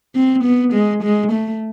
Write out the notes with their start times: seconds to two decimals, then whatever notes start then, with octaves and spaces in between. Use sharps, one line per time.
0.15 C4
0.44 B3
0.73 G#3
1.03 G#3
1.32 A3